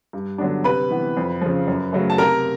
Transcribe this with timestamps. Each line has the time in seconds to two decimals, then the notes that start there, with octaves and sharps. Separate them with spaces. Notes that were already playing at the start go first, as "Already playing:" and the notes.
0.13 G2
0.38 D3 F#3 B3 D4
0.64 C3 B4 B5
0.91 E3 G3 B3
1.17 F2
1.41 C#3 F3
1.67 F#2
1.93 C#3 F#3 A3
2.10 A5
2.18 C3 A#4 A#5